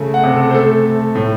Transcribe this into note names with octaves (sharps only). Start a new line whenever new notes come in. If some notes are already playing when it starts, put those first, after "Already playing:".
Already playing: C#3 A3
F#5
C3
A4
C5
A3 A4
A3
A2